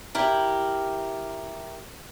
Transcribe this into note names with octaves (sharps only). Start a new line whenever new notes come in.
E4 G4 A#4